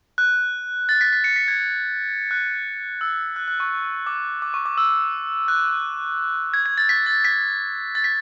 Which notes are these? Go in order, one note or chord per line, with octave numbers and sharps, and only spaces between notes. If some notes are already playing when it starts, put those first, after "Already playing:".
F#6
A6
B6
B6
C#7
B6
G#6
F#6
E6
F#6
F#6
C#6
D6
D6
C#6
D6
E6
F#6
G#6
G#6
A6
B6
A6
B6
A6
B6